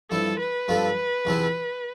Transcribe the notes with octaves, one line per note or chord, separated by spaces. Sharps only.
G2 F3 C4 E4 A4
B4
G2 F3 C4 F4 A4
E2 C3 F3 C4 E4